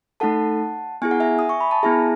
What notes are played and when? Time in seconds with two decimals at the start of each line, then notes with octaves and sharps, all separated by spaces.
0.20 A3 D#4 A4 F#5 A5
1.02 B3 E4 G#4 G#5
1.11 F#5
1.20 E5 G#5
1.39 D#6
1.49 C#6
1.60 B5
1.71 A5
1.83 B3 E4 G#4 E5 G#5